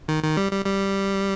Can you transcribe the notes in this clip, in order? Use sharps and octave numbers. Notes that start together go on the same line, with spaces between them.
D#3
D#3
G3
G3
G3